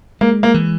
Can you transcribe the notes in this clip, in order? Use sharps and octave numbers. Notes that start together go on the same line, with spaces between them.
G#3 A#3
A#3
E3